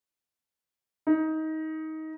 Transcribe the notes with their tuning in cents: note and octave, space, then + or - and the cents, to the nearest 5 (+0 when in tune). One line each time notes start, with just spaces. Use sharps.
D#4 +20